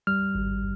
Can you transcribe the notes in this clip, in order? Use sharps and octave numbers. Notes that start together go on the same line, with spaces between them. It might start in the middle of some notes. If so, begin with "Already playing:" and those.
G3 F6
G#1